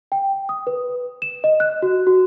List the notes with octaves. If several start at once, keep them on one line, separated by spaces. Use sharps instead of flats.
G5
D#6
B4
E7
D#5
F#6
F#4
F#4